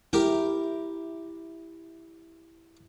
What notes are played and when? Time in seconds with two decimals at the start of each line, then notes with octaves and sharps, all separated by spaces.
0.13 E4 G4 A#4 G5